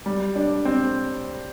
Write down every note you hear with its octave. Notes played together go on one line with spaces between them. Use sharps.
G3
D4
C4